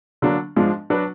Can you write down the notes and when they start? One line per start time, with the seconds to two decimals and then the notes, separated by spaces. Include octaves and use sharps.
0.22 D3 F#3 A#3 D4
0.56 G#2 F3 G#3 D4
0.90 F#3 D4 F#4 B4